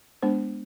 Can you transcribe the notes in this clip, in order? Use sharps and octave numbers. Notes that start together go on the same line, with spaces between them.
G#3 B3 D4 C5